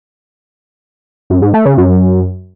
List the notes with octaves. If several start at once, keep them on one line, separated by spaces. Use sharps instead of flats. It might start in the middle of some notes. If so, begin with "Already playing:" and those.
F#2
G#2
A3
C#3
F#2